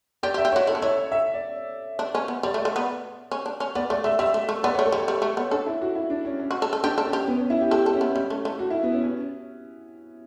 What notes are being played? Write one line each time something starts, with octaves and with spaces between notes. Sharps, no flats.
G4 D5
G4
E5
G4
C#5
F#4
E4 A4
D4
E4 C#5
E5
D5
D4
C#4
B3
G3 D5
A3
D5
A3
B3
C#4
D4
C#4
B3 D5
A3 D5
A3 E5
G3 E5
A3
A3
B3 D5
C#5
A3
A4
G3
G4
G3
A3
B3
D4 A4
E4
F#4
E4
D4
C#4
C#4
F#4
A4
A4
D4 G4
A4
C#4
G4
B3
C#4
E4
G4
G4 A4
A4
C#4
B3
G3 C#4
A3
A3
F#4
E4
B3
C#4
C#4